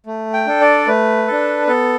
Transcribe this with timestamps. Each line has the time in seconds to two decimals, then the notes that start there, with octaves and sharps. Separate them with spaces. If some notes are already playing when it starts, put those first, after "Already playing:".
0.06 A3
0.33 G5
0.47 D4 A4
0.61 D5
0.87 A3 B4
1.28 D4 A4
1.67 B3 A4